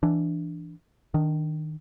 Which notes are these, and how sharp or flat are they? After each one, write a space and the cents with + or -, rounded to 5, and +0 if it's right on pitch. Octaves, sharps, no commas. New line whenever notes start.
E3 +15 D4 +0
D#3 +0 D4 +15